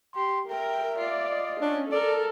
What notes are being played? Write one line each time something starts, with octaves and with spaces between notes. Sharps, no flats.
G4 C6
A#4 E5 G5
F4 D5
D#5
C#4 D4
A4 A#4 D5